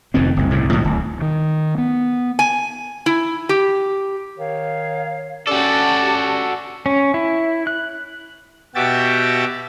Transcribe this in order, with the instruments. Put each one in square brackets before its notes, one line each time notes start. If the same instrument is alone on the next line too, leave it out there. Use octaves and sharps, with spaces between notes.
[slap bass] F1 F2 D#3 C4
F#1 C2
C2 A2 C#3
B1 A2 D#3 F3
D1
[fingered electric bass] D#3
B3
[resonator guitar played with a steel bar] G#5
E4
G4
[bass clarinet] D#3 [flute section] C#5 F5
[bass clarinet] C#4 [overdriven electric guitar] F#4 A4 [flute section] G4 A5 [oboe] D5
[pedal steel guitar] C#4
E4
F#6
[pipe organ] B2 F#4 G4 E5 G5 A6